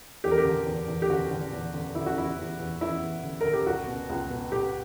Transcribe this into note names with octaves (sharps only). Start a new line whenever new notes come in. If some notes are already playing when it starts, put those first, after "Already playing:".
E2 G4
A#4
G4
D3
E2
E2
G4
D3 F#4
D3
E2
D3
D3 E4
F#4
E2 E4
E2
E2
E2 E4
E2
D3
D3 A#4
G4
C#2 F#4
B2
C#2
B2
B2 G4